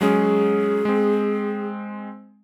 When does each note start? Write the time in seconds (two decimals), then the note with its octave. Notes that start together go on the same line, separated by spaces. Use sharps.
0.01 F#3 G#3 C#4 G#4
0.85 G#3 C4